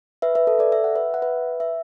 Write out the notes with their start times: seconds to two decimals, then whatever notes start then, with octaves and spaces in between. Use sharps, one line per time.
0.22 B4 E5
0.35 B4 E5
0.47 A4
0.59 A4 D5
0.72 E5
0.84 F#5
0.95 B4 E5
1.14 F#5
1.22 B4 E5
1.60 E5